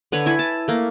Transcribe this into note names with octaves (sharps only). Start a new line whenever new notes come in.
D3 B4 C#5
E4 G#5 C#6
A5
A3 A#3